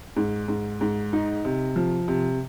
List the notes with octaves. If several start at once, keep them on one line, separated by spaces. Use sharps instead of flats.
G#2
G#2
G#2
D#4
C3
F3
C3